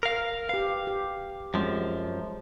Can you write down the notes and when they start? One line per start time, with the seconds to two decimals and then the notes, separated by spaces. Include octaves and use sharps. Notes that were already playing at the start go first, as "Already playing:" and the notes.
0.03 A#4 F5
0.49 G4 B4 F5
0.87 G4
1.54 F#2 F3 G3 G#3 C4